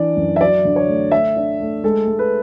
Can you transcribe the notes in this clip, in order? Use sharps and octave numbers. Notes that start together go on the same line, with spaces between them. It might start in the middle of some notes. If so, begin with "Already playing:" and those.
Already playing: E3 D4 D5
F#2
E5
F#3 D5
D3
C#5
A3
A3 E5
D4
A3
G#3 A4
G#3
B4